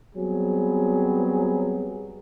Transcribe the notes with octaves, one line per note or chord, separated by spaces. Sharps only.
F#3 G3 B3 C4 G#4